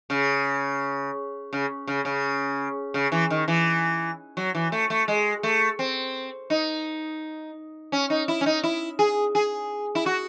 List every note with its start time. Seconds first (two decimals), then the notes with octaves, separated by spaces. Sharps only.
0.10 C#3
1.53 C#3
1.87 C#3
2.05 C#3
2.94 C#3
3.12 E3
3.30 D#3
3.48 E3
4.37 F#3
4.55 E3
4.72 A3
4.90 A3
5.08 G#3
5.43 A3
5.79 C4
6.50 D#4
7.92 C#4
8.10 D#4
8.28 E4
8.41 C#4
8.46 D#4
8.63 E4
8.99 G#4
9.35 G#4
9.95 E4
10.06 F#4